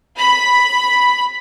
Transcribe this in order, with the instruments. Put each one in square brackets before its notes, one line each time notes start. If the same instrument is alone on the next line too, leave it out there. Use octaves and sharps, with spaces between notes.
[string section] B5